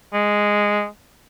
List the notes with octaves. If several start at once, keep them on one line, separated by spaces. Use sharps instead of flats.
G#3